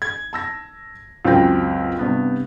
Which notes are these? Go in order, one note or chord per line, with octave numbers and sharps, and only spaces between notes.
G#6
A5 E6 A#6
C#2 F#2 C4 G5 A#6
G2 C3 B3